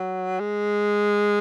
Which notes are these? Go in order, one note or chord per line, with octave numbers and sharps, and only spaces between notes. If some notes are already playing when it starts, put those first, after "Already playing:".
Already playing: F#3
G#3